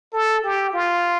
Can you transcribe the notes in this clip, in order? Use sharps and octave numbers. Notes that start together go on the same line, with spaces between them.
A4
G4
F4